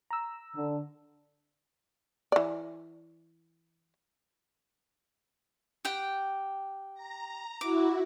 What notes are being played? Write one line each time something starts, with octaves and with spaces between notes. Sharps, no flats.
A#5 E6
D3
E3 D5
G4 F#5 G5
A#5
E4 F#4 D6